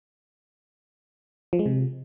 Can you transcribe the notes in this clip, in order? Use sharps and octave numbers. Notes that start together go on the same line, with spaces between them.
F3
G#3
C3